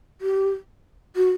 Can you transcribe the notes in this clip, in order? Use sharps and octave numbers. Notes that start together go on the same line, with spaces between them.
G4
F#4